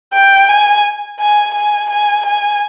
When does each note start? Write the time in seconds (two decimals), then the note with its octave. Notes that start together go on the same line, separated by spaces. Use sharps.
0.13 G5
0.49 G#5
1.20 G#5
1.54 G#5
1.90 G#5
2.26 G#5